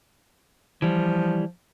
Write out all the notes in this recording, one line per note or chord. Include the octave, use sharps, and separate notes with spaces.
E3 F3 G3